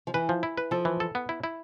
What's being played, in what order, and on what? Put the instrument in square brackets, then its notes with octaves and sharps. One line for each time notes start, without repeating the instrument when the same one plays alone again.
[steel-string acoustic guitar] F3
[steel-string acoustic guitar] E3 [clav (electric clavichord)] B4
[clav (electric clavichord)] F3
E4
B4
[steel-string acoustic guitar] F3 [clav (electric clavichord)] A4
[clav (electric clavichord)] E3
A4
B3
E4
E4